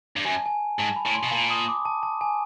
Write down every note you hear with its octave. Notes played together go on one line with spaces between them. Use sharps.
G2
F#2 G#5
A5
G#5
G#2 A5
B5
A2
C6
B2
A#2
D#6
D6
A5
A5
G#5